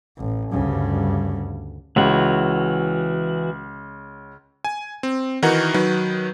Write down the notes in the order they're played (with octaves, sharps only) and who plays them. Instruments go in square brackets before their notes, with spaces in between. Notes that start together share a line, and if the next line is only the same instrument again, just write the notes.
[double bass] A1
[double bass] D2 C#3 [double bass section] G2
[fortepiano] C#2 [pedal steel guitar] E3 F#4
[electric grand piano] G#5
C4
D#3 E3 D#4 F#4 A#4 F#5
D#3 F#3 B4